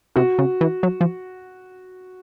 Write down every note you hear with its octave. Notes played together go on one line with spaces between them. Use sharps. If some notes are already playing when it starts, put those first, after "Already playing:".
C3 F#4
C#3
E3
F#3
F3